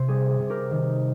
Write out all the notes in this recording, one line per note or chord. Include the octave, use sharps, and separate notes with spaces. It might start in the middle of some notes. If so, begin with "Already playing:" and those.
Already playing: C3 C5
G3 G#4
G#4
C3
G4 A#4
D#3